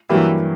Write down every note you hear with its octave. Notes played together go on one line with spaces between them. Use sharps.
G2 E3 F#3 A#3 E4 G4